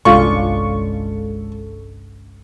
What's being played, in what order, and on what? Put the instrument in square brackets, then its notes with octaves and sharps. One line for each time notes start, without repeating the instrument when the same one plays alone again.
[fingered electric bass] G1 C2 [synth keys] G#3 A4 [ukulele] C#4 D4 F4 [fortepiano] C#6